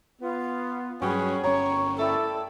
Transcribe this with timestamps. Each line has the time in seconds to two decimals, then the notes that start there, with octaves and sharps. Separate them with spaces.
0.21 B3 F4
1.02 G2 F#3 C#4 F#4 G#4 B4 G5
1.44 G1 C#4 C#5 A#5 C#6 D6
1.99 A3 E4 A4 D5 G5